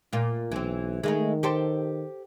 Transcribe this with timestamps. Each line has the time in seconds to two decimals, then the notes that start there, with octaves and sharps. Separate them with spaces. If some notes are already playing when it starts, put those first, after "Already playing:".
0.13 A#2 F4
0.52 B1 E3 C4
1.04 D#3 G#3 A3 D#4
1.43 G4 A4 C5